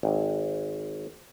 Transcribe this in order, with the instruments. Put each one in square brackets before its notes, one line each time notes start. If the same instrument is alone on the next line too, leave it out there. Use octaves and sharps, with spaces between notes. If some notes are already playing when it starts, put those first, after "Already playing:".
[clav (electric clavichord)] G#1